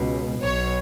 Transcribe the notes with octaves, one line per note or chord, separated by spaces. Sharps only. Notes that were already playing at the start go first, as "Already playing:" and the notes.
Already playing: C#2 B2
B1 B2 C#5